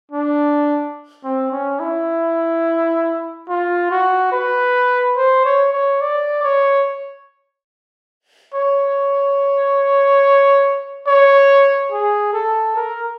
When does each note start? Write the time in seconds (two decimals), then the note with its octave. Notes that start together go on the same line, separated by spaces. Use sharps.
0.11 D4
1.24 C4
1.52 C#4
1.80 E4
3.49 F4
3.91 F#4
4.32 B4
5.17 C5
5.45 C#5
5.73 C#5
6.01 D5
6.43 C#5
8.54 C#5
11.07 C#5
11.92 G#4
12.33 A4
12.76 A#4